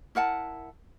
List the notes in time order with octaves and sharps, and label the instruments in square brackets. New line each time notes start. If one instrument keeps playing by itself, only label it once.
[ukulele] E4 A#4 F#5 A5